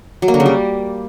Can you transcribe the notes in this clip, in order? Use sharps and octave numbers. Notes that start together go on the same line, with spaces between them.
F#3
A#3
D3
C#3
G3